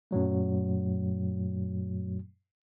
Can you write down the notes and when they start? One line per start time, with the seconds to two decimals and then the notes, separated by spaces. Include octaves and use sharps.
0.11 F#2 A#2 F#3 A3